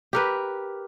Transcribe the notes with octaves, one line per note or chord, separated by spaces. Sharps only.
G4 A#4 B4